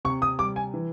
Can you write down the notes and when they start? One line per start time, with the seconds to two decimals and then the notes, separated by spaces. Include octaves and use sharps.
0.05 C3 C#6
0.22 D#6
0.39 G3 D6
0.56 G#5
0.74 E3